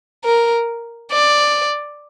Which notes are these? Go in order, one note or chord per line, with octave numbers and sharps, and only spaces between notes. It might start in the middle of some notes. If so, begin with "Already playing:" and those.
A#4
D5